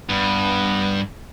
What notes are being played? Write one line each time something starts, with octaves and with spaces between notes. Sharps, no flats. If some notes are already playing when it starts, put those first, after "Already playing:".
G2 B3